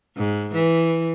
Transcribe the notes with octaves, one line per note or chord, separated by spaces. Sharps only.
G#2
E3